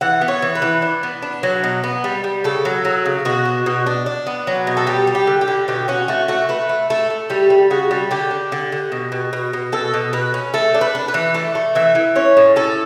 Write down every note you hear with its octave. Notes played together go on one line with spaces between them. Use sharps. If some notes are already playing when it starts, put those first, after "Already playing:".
E3 F#5
B3
C#5
E3
B4
E3
D4
B3
D4
F#3
B2
B3
G3
G3
C#3 A4
F#3
F#3
C#3
B2 F#4
D4
B2
D4
D4
B3
F#3
B2
A4
G3 G4
G3
G4
D3
G4
D3
B2 G4
C#4 F#4
A3 F#4
A3 F#4
A3 B4
A3
A3 A4
A3
G3 G4
G3
C#3 F#4
G3
D3 G4
D4
D3
D3
B2
B2
B2
B2
B2 A4
B2
B2 B4
C#4
A3 A4
D4
B4
D4
B4
E3
A3 D5
A3
E3 E5
E3
C#4 C#5
A2
C#4 A4